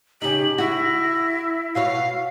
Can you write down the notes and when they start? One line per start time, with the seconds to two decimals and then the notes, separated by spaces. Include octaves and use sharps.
0.22 C#3 D#4 G4 F#7
0.58 E4 F#4 A#6
1.75 B2 F#4 C#5 F5 C7